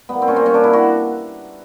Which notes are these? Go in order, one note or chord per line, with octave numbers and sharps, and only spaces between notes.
G3 A#3 B3
C4
A#2 C#4
C4
G3 A#3 C#4
D4
C3 E4
F#4